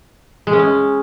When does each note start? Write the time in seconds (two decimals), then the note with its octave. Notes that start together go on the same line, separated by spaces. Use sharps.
0.47 G#3
0.53 C#4
0.59 G#3